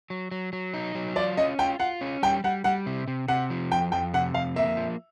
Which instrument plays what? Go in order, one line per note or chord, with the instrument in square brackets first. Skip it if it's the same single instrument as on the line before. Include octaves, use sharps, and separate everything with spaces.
[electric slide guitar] F#3
F#3
F#3
D#4
F#3
[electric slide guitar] F4 [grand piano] D5
[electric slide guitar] C#4 [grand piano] D#5
[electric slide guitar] F4 [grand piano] G5
[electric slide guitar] F4 [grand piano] F#5
[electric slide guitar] C#4
[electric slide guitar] G3 [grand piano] G5
[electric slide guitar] G3 [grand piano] F#5
[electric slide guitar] G3 [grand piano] F#5
[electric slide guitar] C3
C3
[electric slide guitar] C3 [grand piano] F#5
[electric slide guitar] F3
[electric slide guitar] F2 [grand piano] G5
[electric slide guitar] F2 [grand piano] G5
[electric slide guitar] C3 [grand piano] F#5
[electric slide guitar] F2 [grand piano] F5
[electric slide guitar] A#3 [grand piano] E5
[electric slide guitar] F3